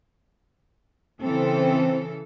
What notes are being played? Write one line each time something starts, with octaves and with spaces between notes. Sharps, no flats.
C#3 E3 C4 A4